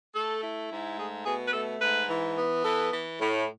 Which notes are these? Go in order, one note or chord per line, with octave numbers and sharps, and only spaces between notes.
A3 A4
E4
G#2
A3 G#4
B2 G#4
B4
A3 A4
G#2 B4
E3
B3
E3 A4
E3
A2